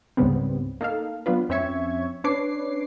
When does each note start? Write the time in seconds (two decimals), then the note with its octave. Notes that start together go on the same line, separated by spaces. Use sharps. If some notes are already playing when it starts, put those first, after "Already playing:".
0.17 C#2 G#2 C#3 G3 B3 C4
0.81 A#3 D#4 A4 F5
1.26 F#3 B3 D4 F4 B4
1.49 F2 C4 C#4 E5 C#6 G#6
2.24 C#4 D4 B4 C#5 D6 C7